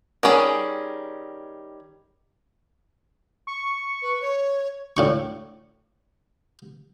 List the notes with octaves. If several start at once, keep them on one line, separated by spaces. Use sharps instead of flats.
D#3 G3 C#4 G#4
C#6
B4
C#5
A2 D4 C#6